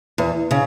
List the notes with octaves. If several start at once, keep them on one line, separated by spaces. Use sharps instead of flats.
E2
C#3